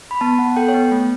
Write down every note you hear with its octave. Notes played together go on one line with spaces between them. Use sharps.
B5
B3 A5
B3 F#5
A4 G5
C#5
B3
A3